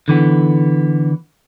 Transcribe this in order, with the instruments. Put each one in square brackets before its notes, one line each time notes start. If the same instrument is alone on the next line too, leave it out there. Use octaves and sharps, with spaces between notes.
[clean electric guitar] D3 E3 B3